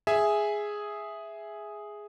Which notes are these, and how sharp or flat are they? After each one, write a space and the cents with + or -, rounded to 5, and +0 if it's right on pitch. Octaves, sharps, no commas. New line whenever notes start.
G#4 +0 E5 +0 G#5 +0